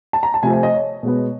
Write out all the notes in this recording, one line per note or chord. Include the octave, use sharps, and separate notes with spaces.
A5
A#5
A5
C3 F3 A3 C4 G#5
G#5
D#5
C#5
B2 G#3 B3